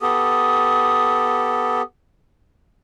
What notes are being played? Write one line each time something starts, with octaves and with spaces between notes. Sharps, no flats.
B3 G4 A4 D#6